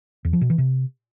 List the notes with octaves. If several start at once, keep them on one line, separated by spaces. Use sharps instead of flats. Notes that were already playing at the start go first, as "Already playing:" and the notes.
E2
F3
B2
E3
C3